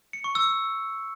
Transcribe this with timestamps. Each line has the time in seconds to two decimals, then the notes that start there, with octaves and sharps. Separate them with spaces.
0.13 C#7
0.24 C#6
0.35 E6